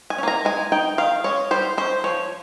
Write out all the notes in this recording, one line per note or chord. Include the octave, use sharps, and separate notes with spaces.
G#5
C#4
A#3 A#5
G#3 G#5
D#4 G5
D#3 F5
G#3 C#4 C#5
G3 C5
C#4 C5
F3 C#5